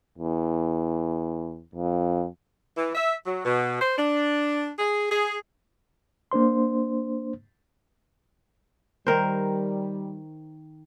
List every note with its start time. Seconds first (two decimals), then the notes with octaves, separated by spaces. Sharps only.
0.18 E2
1.75 F2
2.76 E3
2.95 E5
3.26 F#3
3.45 B2
3.81 C5
3.97 D4
4.79 G#4
5.12 G#4
6.32 A#3 D4 C5 C6
9.07 D#3 G3 A#4 C5